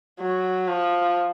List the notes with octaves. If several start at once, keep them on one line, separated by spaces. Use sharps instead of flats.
F#3
F3